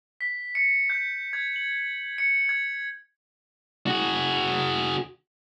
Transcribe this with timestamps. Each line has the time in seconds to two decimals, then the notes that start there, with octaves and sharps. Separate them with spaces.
0.21 B6
0.55 C#7
0.90 G6
1.33 G#6
1.56 F#7
2.18 C#7
2.49 G#6
3.87 F#4 G#4